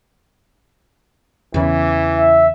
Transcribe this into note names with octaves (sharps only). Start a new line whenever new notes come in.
E2 C#3 E3
E5